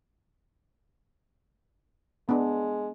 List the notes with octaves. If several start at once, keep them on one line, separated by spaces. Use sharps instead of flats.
G#3 B3 D4